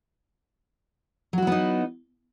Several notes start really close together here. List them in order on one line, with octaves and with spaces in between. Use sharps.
F#3 F#4 E4 B3 D#4